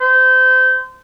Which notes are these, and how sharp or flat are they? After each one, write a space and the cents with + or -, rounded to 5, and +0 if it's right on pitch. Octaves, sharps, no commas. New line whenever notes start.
C5 -25